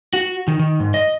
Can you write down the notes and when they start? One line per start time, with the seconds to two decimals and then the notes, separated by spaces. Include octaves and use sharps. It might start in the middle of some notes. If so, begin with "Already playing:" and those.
0.13 F#4
0.48 D#3
0.59 D#3
0.80 G#2
0.94 D#5